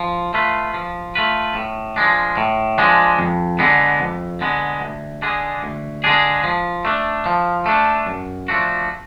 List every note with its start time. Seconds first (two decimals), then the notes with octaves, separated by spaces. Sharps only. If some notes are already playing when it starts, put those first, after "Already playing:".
Already playing: F3
0.34 A3 F4 B4
0.74 F3
1.15 A3 F4 B4
1.55 A2
1.96 F3 G#3 D4
2.37 A2
2.78 F3 G#3 D4
3.19 F2
3.59 D3 G#3 B3
4.00 F2
4.41 D3 G#3 B3
4.81 D2
5.22 D3 G#3 D4 G#4
5.63 D2
6.04 D3 G#3 D4 G#4
6.44 F3
6.85 A3 D4
7.26 F3
7.66 A3 D4
8.06 F#2
8.48 F3 A3 D4 F#4